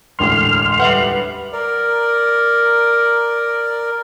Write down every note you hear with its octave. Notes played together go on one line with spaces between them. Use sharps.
E1 A1 D2 C6 F6
G3 B4 E5 F#5
A#4 D5